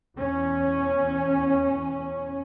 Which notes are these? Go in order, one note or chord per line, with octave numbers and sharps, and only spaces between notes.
E2 C#4